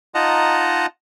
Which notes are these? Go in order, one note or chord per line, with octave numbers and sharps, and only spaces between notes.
D#4 F4 D#5 F#5 A5 A#5